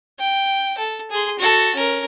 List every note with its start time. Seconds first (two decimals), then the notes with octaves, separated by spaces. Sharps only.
0.20 G5
0.78 A4
1.11 G#4 C6
1.39 F#4 A4
1.76 C#4 A#4